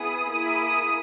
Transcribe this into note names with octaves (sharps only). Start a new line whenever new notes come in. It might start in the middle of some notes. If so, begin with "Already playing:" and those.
Already playing: B3 E4 G#4 D#6
A#3 E4 G#4
D#6